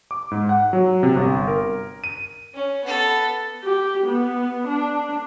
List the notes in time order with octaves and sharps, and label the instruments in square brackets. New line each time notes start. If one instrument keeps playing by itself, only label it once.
[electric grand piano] D6
G#2
F#5
F#3
C3
G1
A#4
D#7
[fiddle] C#4
B3 A4
[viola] G4
B3
D4